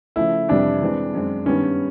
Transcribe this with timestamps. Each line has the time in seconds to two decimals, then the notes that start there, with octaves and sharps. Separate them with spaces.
0.16 C#3 F3 A3 E4
0.48 F2 C3 E3 G3 D4
0.82 E3 G#3 C4
1.13 F#2 D#3 G#3 C4
1.46 G2 D#3 G3 B3 C#4